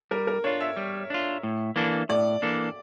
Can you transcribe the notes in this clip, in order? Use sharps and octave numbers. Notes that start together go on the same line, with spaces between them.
G3 A#4
A#4
D4 F4 C#5
E5
G3
D4 F4
A2
E3 A#3 D4 A4
A2 D5
E3 A#3 D4 A4